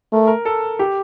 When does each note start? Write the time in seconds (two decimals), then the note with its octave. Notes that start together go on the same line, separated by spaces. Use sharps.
0.12 A3 A#4
0.27 A#4
0.45 A4
0.79 G4